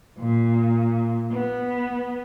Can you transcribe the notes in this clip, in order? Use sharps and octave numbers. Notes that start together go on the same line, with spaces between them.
A#2
B3